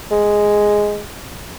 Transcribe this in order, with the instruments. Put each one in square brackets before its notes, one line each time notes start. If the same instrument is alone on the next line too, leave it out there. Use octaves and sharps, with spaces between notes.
[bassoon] G#3